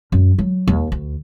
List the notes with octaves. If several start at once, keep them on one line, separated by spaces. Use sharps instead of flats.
F#2
F#3
D#2
D2